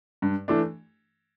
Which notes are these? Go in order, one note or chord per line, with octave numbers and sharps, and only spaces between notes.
G2
E3 A3 D4